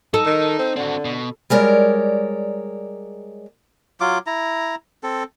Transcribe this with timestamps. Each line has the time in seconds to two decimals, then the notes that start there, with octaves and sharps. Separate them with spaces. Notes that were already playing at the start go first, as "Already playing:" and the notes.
0.14 D#4 A4
0.26 D#3
0.59 C4
0.76 D3 C4 F#4
1.05 B2
1.50 G3 G#3 A#4 C#5 D5
4.00 F#3 F4 D6
4.27 E4 A#5
5.03 C4 A4